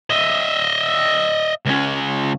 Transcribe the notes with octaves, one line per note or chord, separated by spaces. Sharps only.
D#5 E5
C#2 C#4